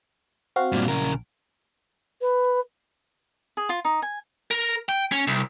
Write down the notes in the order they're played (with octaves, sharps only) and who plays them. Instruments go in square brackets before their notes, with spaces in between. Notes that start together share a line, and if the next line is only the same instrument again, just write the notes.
[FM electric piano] C4 F#4 F5
[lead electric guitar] G2 A#2
[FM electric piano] A#1 [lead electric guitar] C#3 A#4
[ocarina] B4
[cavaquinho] G#4
F4
D#4
G#5
[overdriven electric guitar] A#4
G5
C#4
C2